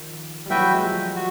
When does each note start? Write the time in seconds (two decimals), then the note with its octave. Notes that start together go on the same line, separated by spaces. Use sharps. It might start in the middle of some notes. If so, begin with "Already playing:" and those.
Already playing: D#3 F3
0.46 G3
0.50 E3 F#3 F#4 B4 E5 G5
0.73 G#3
0.83 F3 G3
1.15 F#4